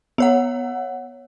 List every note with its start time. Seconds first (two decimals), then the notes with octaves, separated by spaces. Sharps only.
0.18 B3 C#5 F#5